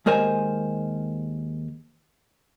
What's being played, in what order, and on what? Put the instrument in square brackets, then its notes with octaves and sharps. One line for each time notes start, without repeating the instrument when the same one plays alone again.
[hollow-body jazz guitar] D#2 G#3 A#4 C5 G#5